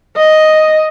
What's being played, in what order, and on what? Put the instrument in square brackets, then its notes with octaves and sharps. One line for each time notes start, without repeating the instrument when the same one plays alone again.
[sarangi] D#5